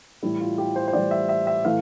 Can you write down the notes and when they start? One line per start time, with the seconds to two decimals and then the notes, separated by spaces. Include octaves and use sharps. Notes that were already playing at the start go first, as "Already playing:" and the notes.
0.23 A2 E3 G3 E4
0.40 F4
0.58 G4
0.76 C5
0.88 C5
0.93 A2 E3 G3 D5
1.11 E5
1.29 E5
1.47 E5
1.65 A2 E3 A3 F5